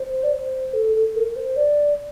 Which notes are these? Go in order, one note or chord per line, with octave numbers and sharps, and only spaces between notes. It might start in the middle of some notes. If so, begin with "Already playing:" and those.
Already playing: C5
D5
C5
A4
A4
A#4
C5
D5